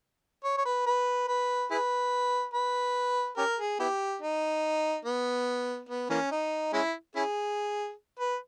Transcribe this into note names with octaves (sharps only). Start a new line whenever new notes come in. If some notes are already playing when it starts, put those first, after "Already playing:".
C#5
C#5
B4
B4
B4
E4 G#4 B4
B4
C#4 G4 A#4
G#4
B3 E4 G4
D#4
B3
B3
E3 A#3 C#4
D#4
G#3 C#4 E4
C#4 E4 G#4
B4